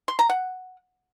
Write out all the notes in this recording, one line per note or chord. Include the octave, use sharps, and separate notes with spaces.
C6
A#5
F#5